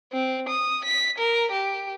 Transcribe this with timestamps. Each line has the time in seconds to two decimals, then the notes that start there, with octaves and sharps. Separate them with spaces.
0.13 C4
0.49 D#6
0.85 B6
1.18 A#4
1.52 G4